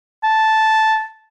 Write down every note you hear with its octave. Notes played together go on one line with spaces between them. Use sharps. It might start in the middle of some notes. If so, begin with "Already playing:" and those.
A5